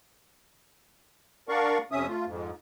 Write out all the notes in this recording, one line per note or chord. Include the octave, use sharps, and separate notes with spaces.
D4 A#4 D5 F5 F#5 C#6
F2 C3 C#4 E5 D#6
A3 F4
F2 G#2